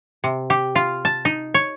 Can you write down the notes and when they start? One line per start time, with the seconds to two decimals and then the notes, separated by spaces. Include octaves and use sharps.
0.24 C3
0.50 G4
0.75 F4
1.05 A5
1.25 D#4
1.54 C#5